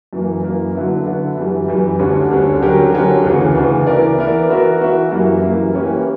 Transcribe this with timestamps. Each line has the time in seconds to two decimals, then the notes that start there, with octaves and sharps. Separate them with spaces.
0.13 F#2 E3 A#3
0.43 F#2 E3 A#3
0.75 D3 F#3 B3 E4
1.06 D3 F#3 B3 E4
1.37 F#2 E3 G3
1.68 F#2 E3 G3
1.99 D2 D3 G3 C#4
2.31 D2 D3 G3 C#4
2.62 D3 F#3 C#4 G4 A#4
2.93 D3 F#3 C#4 G4 A#4
3.24 D2 C#3 E3
3.55 D2 C#3 E3
3.87 E3 B3 E4 A#4 D5
4.18 E3 B3 E4 A#4 D5
4.49 E3 B3 F#4 A#4 E5
4.81 E3 B3 F#4 A#4 E5
5.11 F#2 E3 G3 A#3 E4
5.42 F#2 E3 G3 A#3 E4
5.73 E3 A#3 C#4 G4 B4